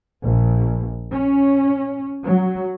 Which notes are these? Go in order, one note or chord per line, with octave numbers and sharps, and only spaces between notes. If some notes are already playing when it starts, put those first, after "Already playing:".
A#1
C#4
F#3